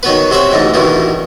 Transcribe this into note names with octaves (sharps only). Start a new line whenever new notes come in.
D#3 F#3 B3 B4
C3 F#3 F#4 C5 E5
A1 D2 G#2 D3 G#3
A1 D2 B2 D#3 E4